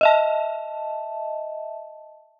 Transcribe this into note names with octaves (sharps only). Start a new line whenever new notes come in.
D#5 E5 A5